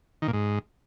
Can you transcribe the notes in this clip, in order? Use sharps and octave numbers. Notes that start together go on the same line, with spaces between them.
D#3
A#2
G#2